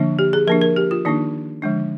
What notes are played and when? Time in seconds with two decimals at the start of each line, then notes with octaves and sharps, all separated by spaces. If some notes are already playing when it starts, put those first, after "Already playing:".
Already playing: D3 F3 A#3 D4
0.19 G4
0.33 G#4
0.47 F3 A#3 D4 A#4
0.61 A#4
0.77 G4
0.91 F4
1.05 D#3 A#3 D4 D#4
1.62 D3 F3 G#3 D4